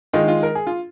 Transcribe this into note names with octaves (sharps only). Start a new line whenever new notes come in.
D#3 G#3 D#4 F4
F4
A#4
G#4
F4